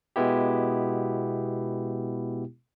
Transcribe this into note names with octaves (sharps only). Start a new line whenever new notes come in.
B2 G#3 B3 E4 G4